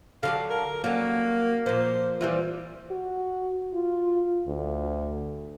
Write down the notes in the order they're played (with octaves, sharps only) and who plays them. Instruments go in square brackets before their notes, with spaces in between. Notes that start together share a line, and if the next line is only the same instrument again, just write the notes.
[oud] D3 F#3 G4 [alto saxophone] F5
[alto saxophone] A#4
[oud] F#3 G3 C#4 [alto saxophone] A#3
[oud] A#2 F3 [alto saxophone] C5
[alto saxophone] E3 [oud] G3 C4 F4
[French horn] F#4
F4
D2